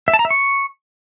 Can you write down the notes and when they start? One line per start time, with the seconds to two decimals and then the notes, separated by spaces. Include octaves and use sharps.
0.08 E5
0.13 A5
0.19 A#5
0.25 E5
0.30 C#6